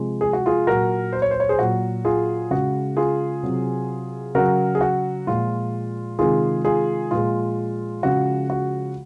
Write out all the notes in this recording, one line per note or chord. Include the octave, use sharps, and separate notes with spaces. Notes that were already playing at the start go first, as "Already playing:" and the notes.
Already playing: C3 F3 G#3
G#4
F#4
F4 G#4
A#2 F#3 F#4 A#4
C5
C#5
C5
C#5
G#4 C5
A#2 F#3 F#4
F4 G#4
C#3 G#3 F#4
F4 G#4
C3 F#3
C#3 F#3 F#4 A#4
G#4
F#4
A#2 F3 G#3 F4
C3 D#3 G#3 F4 G#4
F4 G#4
A#2 F3 G#3 F4
C#3 F3 G#3 F#4
F#4